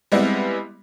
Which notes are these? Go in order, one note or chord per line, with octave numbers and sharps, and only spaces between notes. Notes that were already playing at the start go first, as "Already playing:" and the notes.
G3 G#3 B3 C4 E4